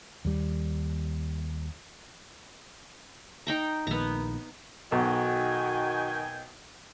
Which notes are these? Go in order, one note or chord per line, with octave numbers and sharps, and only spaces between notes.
D#2 G3
D#4 G5 A#5
A#1 D#3 B3 A#5
B1 D#3 F#4 G5 G#5